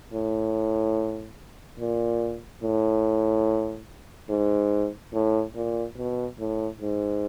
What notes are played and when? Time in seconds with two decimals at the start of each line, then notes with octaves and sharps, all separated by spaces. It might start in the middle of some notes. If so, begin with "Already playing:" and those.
0.13 A2
1.80 A#2
2.63 A2
4.30 G#2
5.13 A2
5.55 A#2
5.97 B2
6.39 A2
6.81 G#2